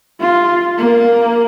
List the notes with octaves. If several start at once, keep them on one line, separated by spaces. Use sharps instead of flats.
F4
A#3